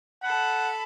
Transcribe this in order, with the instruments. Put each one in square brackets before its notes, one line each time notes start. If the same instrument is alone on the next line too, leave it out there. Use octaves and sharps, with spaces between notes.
[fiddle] A4 B5 [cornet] F#5